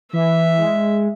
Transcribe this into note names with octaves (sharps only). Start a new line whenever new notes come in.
E3 E5
G#3